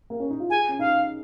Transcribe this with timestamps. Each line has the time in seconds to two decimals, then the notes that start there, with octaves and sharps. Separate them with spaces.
0.10 A#3
0.20 C#4
0.30 D#4
0.40 F4
0.50 G#4 G#5
0.69 C#4
0.79 D#4 F5